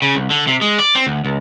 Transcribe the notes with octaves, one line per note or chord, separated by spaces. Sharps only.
C#3
C2
D3
C3
G#3
D5
C4
D2
C#2